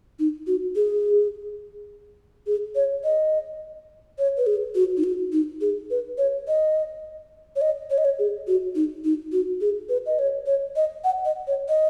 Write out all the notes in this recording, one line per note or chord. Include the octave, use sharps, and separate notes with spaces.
D#4
F#4
G#4
G#4
C#5
D#5
C#5
B4
G#4
F#4
D#4
F#4
D#4
G#4
B4
C#5
D#5
C#5
D#5
C#5
D#5
C#5
G#4
F#4
D#4
D#4
F#4
G#4
B4
D#5
C#5
C#5
D#5
F#5
D#5
C#5
D#5